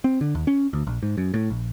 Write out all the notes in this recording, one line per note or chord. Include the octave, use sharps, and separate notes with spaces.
C4
D3
D#2
C#4
D2
A#1
G#2
F#2
A2
A#1